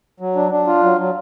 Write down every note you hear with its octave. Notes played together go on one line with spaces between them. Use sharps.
F#3
D4
D4
F4
F#3
F#3